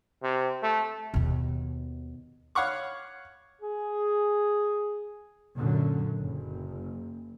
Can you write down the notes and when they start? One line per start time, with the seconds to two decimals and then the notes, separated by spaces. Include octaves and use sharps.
0.23 C3
0.63 A3
1.14 D#2 B2
2.55 C#5 F5 F#5 B5 C#6 D6
3.61 G#4
5.57 F#2 A#2 D3 F#3
6.19 F#1